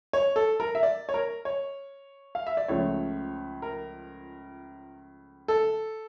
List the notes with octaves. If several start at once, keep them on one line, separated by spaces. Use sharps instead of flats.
C#5
A4
A#4
E5
D5
C#5
A#4
C#5
F5
E5
D5
C#2 C#3 F3 A3 C#5
A#4
A4